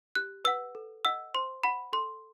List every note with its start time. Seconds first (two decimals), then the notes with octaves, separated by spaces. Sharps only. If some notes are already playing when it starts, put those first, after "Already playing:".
0.15 G4 F#6
0.45 B4 F#5 E6
0.75 A4
1.05 D#5 F#5 E6
1.34 C5 C6
1.63 F#5 B5
1.93 A4 C6